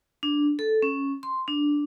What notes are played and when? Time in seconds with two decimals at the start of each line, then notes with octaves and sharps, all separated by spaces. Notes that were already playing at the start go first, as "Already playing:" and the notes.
0.23 D4
0.59 A4
0.82 C#4
1.23 C6
1.48 D4